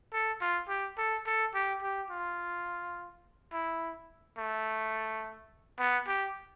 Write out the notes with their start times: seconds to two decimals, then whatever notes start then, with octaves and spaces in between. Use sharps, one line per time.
0.13 A4
0.41 F4
0.68 G4
0.98 A4
1.26 A4
1.54 G4
1.82 G4
2.10 F4
3.53 E4
4.38 A3
5.79 B3
6.07 G4